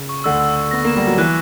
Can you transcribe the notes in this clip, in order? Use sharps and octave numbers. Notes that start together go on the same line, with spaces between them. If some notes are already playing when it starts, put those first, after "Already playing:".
Already playing: C#3
C#6
D2 D3 E6
E6
E6
B3 A#6
A#3 E7
G3
F#3 A#6
E3 F#6